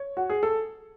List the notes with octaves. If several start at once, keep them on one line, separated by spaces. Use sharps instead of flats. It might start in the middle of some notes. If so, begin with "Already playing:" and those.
Already playing: C#5
F#4
G#4
A4